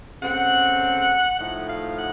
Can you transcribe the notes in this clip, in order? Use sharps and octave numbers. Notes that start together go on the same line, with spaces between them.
C#3 A3 C4 F#5
A2 F3 A3 D#4 F#5
F5
F#5